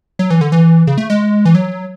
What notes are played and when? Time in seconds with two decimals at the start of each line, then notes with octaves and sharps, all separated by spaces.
0.19 F#3
0.30 E3
0.41 D3
0.52 E3
0.87 C#3
0.98 A3
1.10 G#3
1.45 E3
1.55 F#3